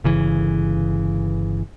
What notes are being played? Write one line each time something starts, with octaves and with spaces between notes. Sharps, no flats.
G1 C#3 E3